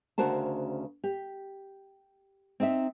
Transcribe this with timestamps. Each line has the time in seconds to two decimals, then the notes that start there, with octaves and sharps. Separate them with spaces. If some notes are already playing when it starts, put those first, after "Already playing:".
0.18 D2 C#3 F#4 A#4 C5 A5
1.04 G4
2.60 C4 D#4 D#5 E5